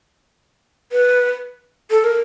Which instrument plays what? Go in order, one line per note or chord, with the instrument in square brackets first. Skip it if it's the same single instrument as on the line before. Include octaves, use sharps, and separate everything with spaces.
[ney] B4
A4
A#4